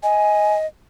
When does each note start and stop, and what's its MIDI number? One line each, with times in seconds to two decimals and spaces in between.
0.03 0.66 75
0.03 0.55 80